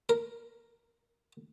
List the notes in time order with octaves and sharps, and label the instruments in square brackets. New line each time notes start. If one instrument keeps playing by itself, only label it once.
[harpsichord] A#4